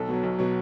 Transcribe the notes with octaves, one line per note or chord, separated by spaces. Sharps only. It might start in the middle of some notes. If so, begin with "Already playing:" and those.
Already playing: B1 A4
B2 F#3
B1
B2 F#3